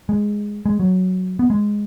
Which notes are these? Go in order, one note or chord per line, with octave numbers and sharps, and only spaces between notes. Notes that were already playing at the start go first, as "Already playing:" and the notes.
G#3
G#3
F#3
B3
G#3